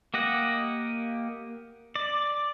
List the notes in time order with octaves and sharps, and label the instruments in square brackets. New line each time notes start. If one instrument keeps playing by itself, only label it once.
[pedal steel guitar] A#3 G4 D#5 F#5
D5